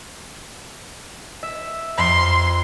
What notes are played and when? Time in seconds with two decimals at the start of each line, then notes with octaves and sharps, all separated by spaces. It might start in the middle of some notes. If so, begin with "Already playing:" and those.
1.43 E5
1.98 F2 C6